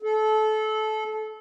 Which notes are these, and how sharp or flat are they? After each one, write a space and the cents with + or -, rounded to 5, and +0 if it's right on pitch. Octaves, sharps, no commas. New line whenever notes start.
A4 -25